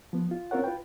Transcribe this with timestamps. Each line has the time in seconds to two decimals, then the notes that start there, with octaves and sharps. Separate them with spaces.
0.13 F3 B3
0.31 F4
0.51 C4 C#4 F4 A#4 C#5 F#5
0.64 F4 B4 G5